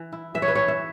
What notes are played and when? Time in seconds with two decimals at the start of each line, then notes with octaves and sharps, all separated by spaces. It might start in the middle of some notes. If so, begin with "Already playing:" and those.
Already playing: E3
0.12 E4
0.34 E3 E5
0.42 C#5
0.48 B4
0.55 E3 C#5
0.68 E5